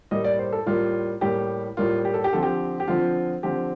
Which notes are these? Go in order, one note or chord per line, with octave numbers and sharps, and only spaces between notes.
A2 G3 A#3 D#5
D5
C5
A4
A2 G3 A#3 F4
A2 G3 A#3 G4
A2 G3 A#3 F4
G4
A4
G4
D3 F3 C4 A4
G4
G4
D3 F3 C4 F4
D3 F3 C4 G4